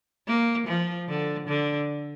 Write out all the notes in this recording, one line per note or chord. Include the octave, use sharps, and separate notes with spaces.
A#3
F3
D3
D3